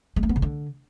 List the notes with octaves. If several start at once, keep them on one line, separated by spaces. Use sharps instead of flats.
G#3
A3
B3
C#3
D3